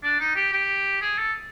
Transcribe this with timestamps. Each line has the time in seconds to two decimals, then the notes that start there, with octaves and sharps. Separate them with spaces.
0.03 D4
0.20 D#4
0.36 G4
0.53 G4
1.02 G#4
1.18 A4